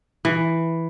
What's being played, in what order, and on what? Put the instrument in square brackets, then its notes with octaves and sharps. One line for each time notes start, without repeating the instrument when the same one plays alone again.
[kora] E3